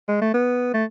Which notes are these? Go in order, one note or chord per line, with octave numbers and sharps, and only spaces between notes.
G#3
A3
B3
A3